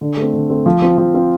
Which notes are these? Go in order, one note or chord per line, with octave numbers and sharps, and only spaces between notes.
D3
A3 C4
D3
A3 C4
F3
C4 F4
F3
C4 F4